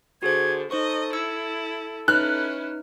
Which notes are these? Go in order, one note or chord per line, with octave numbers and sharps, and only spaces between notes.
D3 F#4 G#4 C5 G#6
D#4 A4 C5 D#5 C#6
E4 E6 G#6 C#7
C#4 D#4 E4 B4 F6 F#6